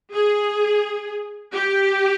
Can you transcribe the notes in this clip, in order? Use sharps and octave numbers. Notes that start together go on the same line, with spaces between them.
G#4
G4